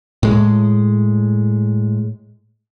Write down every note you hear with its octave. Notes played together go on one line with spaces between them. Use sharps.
A2 G#3